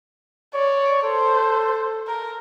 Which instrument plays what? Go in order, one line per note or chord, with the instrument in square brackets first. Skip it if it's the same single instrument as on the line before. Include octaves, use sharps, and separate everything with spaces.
[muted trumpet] C#5 [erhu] D5
[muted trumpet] A4 [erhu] C5
[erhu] A#4